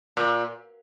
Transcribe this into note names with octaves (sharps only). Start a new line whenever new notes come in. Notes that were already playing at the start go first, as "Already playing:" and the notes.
A#2